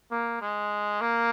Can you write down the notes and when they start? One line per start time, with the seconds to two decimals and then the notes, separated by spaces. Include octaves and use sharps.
0.11 A#3
0.41 G#3
1.01 A#3